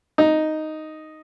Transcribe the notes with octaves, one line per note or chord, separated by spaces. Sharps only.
D#4